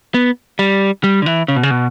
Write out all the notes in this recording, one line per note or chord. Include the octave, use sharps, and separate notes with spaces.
B3
G3
G3
D3
E3
C#3
B2
C#3
B2